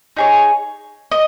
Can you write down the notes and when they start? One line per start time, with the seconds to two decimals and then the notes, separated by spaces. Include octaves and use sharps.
0.17 D#4 G#4 C#5
1.12 D#5